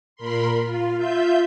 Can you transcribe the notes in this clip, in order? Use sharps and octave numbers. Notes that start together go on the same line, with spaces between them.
A#2 A#4 B5 C6
F4
F4 E5 G6